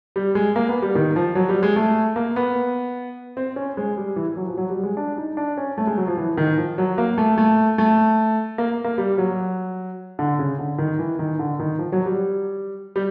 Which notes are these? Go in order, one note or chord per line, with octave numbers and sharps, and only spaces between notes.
G3
G#3
A#3
B3
G3
D#3
F3
F#3
G3
G#3
A3
A#3
B3
C4
C#4
G#3
G3
E3
F#3
F3
F#3
G3
G#3
D4
D#4
D4
C#4
A3
G#3
F#3
F3
E3
D#3
F3
F#3
A#3
A3
A3
A3
A#3
A#3
G3
F#3
D3
C#3
D3
D#3
E3
D#3
D3
D#3
F3
F#3
G3
G3